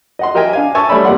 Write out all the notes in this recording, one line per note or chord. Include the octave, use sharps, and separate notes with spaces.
D#5 F#5 C6
G4 A#4 D#5 E5 G5 G#5
D4 F5 G#5
E5 G#5 A5 C#6 E6
G3 A3 C#5 D5 B5 E6
G#1 G3 A#3 D5 F#5 C6